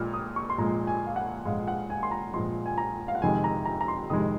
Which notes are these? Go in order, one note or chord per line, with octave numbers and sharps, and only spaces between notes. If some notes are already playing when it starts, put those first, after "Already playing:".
Already playing: A#2 F3 G#3 F6
D#6
C#6
C6
A#2 F3 G#3 A#5
G#5
F5
F#5
A#2 F3 G#3 F5
F#5
G#5
C6
A#5
A#2 F3 G#3 C6
G#5
A#5
F5
F#5
F2 C3 D#3 G#3 G#5
A#5
A#5
A#5
C6
F2 C3 D#3 G#3 D#6